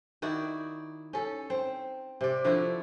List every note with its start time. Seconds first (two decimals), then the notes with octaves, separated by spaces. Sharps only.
0.22 D#3 E4 F#4 D5
1.13 C#4 A4
1.50 C4
2.21 C3 D5
2.44 D3 F3 E4 F#4